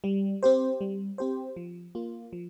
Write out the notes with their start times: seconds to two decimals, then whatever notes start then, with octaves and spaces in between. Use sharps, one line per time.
0.04 G3
0.43 C4 G4 C5
0.81 G3
1.18 C4 G4 C5
1.56 F3
1.95 A#3 F4
2.33 F3